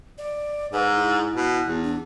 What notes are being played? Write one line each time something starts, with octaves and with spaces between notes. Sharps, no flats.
D5
G#2 B4
E4
B2
E2
D4